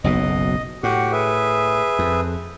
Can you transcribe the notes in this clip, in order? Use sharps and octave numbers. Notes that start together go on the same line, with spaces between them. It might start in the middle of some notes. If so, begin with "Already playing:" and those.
F#1 B1 B2 D#5
A2 F#4 G4 F#5
G#4 B4 E5
F2